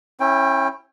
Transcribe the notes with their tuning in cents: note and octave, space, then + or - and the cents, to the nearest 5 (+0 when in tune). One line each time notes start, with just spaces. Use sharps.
C#4 -30 E4 +0 G5 +15